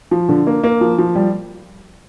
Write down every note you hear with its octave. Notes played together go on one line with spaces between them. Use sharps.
F3
D3
A#3
A#3
F3
F3
G3